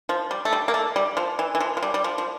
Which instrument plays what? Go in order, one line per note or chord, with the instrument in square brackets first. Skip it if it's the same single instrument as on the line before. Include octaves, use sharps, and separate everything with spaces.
[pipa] F3
G3
A3
G3
A#3
A3
G3
F3
E3
E3
F3
F3
G3
G3
F3
F3